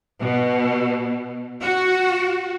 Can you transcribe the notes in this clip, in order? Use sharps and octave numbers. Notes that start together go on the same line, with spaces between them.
B2
F#4